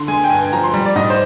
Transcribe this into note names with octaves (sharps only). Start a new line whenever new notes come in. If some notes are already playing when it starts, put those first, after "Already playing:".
Already playing: D3 C6
G#3 G#5
G5
G2 G#5
G#5
F3 A#5
C6
G3 A#5
D5
G#2 D#5
C5